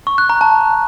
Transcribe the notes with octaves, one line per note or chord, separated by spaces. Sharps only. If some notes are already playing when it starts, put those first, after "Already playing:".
C#6
F#6
A#5
A5